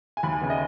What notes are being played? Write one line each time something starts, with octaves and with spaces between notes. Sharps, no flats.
G#5
D#2 B5
G#5
C#3 B3
D#5